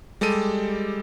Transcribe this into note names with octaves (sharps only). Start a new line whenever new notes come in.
G3 G#3 G4 A4 D#7